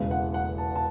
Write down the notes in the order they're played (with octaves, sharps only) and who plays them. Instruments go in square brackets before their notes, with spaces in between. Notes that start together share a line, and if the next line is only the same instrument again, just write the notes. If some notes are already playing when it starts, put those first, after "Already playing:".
Already playing: [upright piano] E1 E2 C#3
F#5
F#5
A5
A5